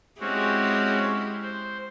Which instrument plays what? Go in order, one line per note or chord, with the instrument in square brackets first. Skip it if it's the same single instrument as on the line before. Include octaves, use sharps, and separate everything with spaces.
[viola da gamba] G#3 E4 G4 [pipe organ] C4 C#4 F#4
[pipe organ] C5